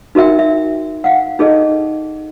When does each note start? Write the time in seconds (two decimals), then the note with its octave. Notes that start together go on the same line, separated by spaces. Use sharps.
0.15 D#4 F#4 A#4 E5 G5
0.39 E5
1.04 F5 F#5
1.39 D#4 G#4 A4 D#5